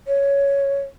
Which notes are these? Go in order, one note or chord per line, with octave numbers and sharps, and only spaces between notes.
C#5